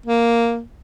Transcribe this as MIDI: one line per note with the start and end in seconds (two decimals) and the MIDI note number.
0.06 0.60 58